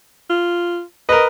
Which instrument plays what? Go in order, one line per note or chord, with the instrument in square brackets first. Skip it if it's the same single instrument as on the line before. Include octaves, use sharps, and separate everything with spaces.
[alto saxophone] F4
[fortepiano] A#4 B4 [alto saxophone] D#5